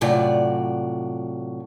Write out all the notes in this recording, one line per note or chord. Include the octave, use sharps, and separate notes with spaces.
A2 C3 F#3 F4 D5 F#5